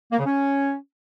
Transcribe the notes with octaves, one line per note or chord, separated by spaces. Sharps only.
A#3
C#3
C#4